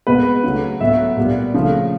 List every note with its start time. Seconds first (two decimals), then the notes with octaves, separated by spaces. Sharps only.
0.07 B2 G#3 B3 B4
0.44 C#3 F#3 A3
0.80 A2 F#3 B3 E5
1.17 A#2 G3 B3
1.54 C#3 F3 A3